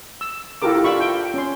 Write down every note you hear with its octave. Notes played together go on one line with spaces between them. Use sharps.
E6
E4 F4 G4 A4 A#4 D6
D4 F4 E5 F5 B5 C#6
G5
C#4 C6